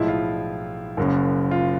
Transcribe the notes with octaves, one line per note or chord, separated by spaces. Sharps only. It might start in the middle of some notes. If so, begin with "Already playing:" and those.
Already playing: B1 A2 F3 G#3 E4
F4
F#1 F#2 C#3
F4